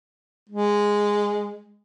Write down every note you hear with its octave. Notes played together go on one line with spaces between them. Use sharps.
G#3